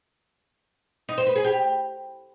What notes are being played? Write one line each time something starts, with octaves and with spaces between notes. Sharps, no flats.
D#4
C5
B4
G#4
G4